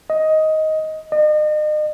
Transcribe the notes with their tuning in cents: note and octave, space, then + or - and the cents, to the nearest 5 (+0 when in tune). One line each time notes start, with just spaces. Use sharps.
D#5 +10
D#5 -40